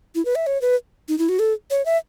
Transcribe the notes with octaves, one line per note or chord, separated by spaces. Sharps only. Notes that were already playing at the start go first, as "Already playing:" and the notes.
E4
B4
E5
C#5
B4
D#4
E4
F#4
A4
C#5
E5